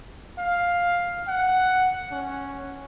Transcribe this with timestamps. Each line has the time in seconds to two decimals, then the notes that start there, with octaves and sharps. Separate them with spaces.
0.38 F5
1.28 F#5
2.11 C#4